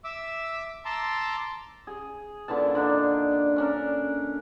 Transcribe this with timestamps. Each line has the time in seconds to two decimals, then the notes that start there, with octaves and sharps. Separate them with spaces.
0.04 E5 D6 E6
0.85 A5 A#5 C6 D6 E6
1.87 G#4
2.48 A#2 D3 E3 A5
2.75 D3 D4 D#4
3.31 D4
3.56 C#4 D4 A#4